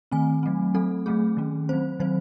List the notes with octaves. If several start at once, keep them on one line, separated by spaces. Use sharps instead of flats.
D#3 A3 C4 G#5
F#3 A3 C4
F#3 A3 C4 A4
F#3 A3 C4 G#4
D#3 A3 C#4
F#3 C4 C5
D#3 F#3 C4 C5